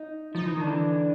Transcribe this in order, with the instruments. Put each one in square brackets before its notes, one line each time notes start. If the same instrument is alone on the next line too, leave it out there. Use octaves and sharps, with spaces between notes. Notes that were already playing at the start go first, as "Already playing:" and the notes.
Already playing: [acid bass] D#4
[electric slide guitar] F3 [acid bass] D#4
[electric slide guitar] E3
[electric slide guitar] D#3 [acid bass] D4
[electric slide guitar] D3 E3